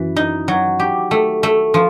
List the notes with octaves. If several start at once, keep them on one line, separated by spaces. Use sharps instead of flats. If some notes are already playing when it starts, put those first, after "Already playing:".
Already playing: F#2 E3
D#4
F#3
G4
A3
A3
F3